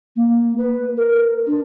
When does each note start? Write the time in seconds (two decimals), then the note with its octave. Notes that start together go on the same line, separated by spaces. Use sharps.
0.16 A#3
0.58 B4
0.97 A#4
1.47 D4